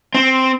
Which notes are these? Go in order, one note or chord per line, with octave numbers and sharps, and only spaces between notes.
C4